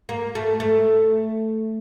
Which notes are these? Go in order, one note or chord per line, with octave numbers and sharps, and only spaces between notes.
A#3
A3
A3